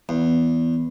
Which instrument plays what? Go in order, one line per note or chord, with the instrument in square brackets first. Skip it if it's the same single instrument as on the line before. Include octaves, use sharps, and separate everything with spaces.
[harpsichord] E2